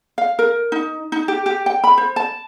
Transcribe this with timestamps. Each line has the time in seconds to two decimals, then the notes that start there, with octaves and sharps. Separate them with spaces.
0.18 F5
0.39 A#4
0.72 D#4
1.12 D#4
1.28 G4
1.46 G4
1.66 G5
1.84 B5
1.98 C5
2.16 A5